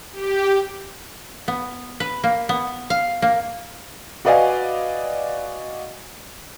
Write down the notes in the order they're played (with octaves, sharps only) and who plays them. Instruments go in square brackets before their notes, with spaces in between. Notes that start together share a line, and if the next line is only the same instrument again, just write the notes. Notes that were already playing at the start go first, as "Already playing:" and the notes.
[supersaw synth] G4
[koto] B3
B4
A#3
B3
F5
A#3
[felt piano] F#4 B4 D5 D#5 F5 G#5